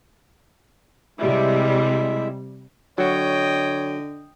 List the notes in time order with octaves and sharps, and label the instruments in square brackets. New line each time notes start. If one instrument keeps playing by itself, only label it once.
[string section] C3 G3 [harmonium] G#3 E4 E5
[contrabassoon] D3 [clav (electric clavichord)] F#3 F#4 [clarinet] C#5 [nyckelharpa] D#5 G5